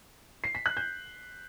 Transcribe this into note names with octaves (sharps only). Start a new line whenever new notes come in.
C7
B6
F#6
G6